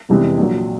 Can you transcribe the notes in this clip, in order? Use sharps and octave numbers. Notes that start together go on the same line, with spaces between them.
F1 E2 C3 E3 G#3
A#1 A#2 F#3